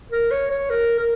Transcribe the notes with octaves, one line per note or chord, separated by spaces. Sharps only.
A#4
C#5
C#5
A#4
A#4